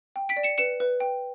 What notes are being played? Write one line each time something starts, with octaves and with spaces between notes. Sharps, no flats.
G5
B6 D7
D5
C#7 E7
B4 C#7 E7
B4
G5